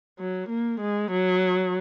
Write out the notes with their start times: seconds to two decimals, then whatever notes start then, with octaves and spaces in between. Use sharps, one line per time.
0.19 F#3
0.49 A#3
0.80 G#3
1.11 F#3